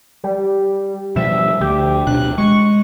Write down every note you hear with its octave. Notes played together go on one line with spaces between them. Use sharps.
G3
B2 F3 G3 E5
D2 G4
D1 B2 D4 F#6
G#3 C#6